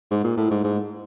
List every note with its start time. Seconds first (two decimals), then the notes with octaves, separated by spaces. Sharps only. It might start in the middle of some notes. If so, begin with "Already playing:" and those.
0.11 G#2
0.24 A#2
0.38 A2
0.51 G#2
0.64 G#2